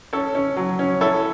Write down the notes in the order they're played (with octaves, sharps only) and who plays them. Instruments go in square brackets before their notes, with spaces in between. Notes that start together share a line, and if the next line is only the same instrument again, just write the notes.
[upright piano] C#4 [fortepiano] A4 C#5
[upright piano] C#4
F#3
C#4
[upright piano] E4 [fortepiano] A4 C#5